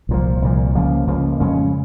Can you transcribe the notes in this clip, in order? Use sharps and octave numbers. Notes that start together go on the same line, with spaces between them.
C2 A#2 F3
C2 A#2 F3
C#2 C#3 F3 A#3
C#2 C#3 F3 A#3
F2 C#3 G#3 C#4